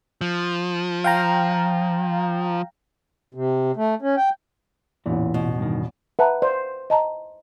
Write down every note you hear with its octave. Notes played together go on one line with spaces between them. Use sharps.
F3
F5 G5 A#5
C3
A3
C#4
G5
A1 E2 A#2 E3
B2
G2 D#3
B4 E5 F#5 A5 A#5
C5 D5
D#5 A5 A#5